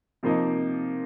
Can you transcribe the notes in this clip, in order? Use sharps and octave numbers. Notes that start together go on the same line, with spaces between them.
C3 F3 A#3 D#4